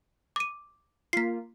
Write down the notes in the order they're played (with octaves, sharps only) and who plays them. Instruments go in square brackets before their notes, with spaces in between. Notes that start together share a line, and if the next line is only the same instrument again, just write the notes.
[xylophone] D6 D#7
[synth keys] A#3 F4 [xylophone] B6 C7